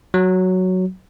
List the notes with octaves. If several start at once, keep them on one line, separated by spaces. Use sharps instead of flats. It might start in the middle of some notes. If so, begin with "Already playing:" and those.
F#3